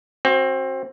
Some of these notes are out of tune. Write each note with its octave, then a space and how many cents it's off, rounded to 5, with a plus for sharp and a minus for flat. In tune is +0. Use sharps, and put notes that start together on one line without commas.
C4 +20 F#4 +0